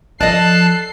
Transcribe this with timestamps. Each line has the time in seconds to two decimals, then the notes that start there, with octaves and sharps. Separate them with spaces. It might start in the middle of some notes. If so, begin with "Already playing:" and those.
0.21 F3 A4 D5 D#5 A5 F#6 C7